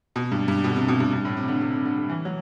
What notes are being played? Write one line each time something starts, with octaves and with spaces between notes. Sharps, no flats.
B2
G2
G2
B2
D3
C3
B2
G2
G2
A2
C3
D3
C3
D3
D3
D3
E3
F#3